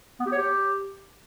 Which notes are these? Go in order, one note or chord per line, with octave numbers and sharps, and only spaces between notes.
B3
G4
C#5
G4